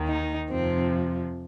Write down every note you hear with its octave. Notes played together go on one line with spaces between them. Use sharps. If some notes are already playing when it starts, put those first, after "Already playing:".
Already playing: D#2 D#3
D#4
F2 C3 F3 C4